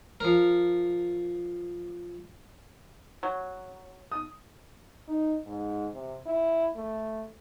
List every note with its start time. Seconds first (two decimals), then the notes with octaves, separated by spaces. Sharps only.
0.20 F3 A#4
3.23 F#3
4.11 D#6
5.08 D#4
5.47 G#2
5.94 C3
6.26 E4
6.76 A3